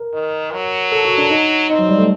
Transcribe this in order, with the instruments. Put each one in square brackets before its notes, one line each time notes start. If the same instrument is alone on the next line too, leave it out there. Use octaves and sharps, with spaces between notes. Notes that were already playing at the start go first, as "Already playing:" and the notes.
Already playing: [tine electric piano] A#4
[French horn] D#3
F#3
[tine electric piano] A4
F#4
D4
D#4
[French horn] C4 [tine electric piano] D#4
[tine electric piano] F#3
G3
A3